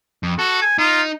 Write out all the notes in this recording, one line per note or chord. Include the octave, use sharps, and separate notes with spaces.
F2
F#4 A4
G#5
D#4 F4